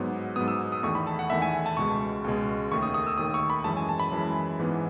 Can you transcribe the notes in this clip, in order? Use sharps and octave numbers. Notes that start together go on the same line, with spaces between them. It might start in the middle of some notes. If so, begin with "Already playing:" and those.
Already playing: G#2 F#3 B3
G#2 F#3 B3 D#6
E6
D#6
E2 D#3 A3 C#6
B5
A5
F#5
E2 D#3 A3 E5
G#5
A5
C#2 B2 G#3 C#6
C#2 B2 G#3
D#2 D#3 A3 C#6
D#6
D#6
E6
D#2 D#3 A3 D#6
C#6
B5
F#2 E3 G#3 A5
G#5
A5
B5
F#2 E3 G#3
G#2 E3 B3